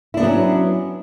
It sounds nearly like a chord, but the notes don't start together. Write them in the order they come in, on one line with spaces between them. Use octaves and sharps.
E4 D4 B3 F#3 C#4